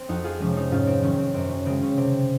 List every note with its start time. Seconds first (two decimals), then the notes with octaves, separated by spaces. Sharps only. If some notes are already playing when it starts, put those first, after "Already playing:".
Already playing: C4
0.09 F2 D#4 F#4
0.24 F4 G#4
0.40 C3 F3 G#3 C#4
0.55 C4 D#4
0.71 G#2 C#4 F4
0.87 C4 D#4
1.02 D#3 F#3 C#4
1.18 C4
1.34 F#2 C4
1.49 C#4
1.65 C#3 G#3 C4
1.81 C#4
1.97 C3 C4